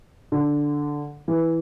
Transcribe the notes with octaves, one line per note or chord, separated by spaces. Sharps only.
D3
E3